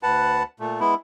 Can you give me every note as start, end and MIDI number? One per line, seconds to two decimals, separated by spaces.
0.03 0.43 38
0.03 0.43 71
0.03 0.43 78
0.03 0.43 81
0.60 0.80 46
0.60 0.80 57
0.80 0.94 56
0.80 0.94 59
0.80 0.94 64